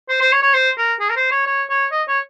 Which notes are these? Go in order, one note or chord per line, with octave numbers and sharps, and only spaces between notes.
C5
C5
C#5
C#5
C5
A#4
G#4
A#4
C5
C#5
C#5
C#5
D#5
C#5